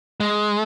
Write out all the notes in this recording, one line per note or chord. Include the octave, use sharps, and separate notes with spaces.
G#3